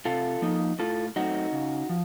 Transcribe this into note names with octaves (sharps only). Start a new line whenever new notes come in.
C3 F4 A4
F3 A#3 D#4
A2 F4 A4
F#3 A3 C4 D#4 F#4
C#3
F3